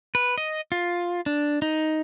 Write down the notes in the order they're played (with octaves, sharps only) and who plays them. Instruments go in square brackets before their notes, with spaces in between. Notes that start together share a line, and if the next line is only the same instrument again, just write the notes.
[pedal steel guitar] B4
D#5
F4
D4
D#4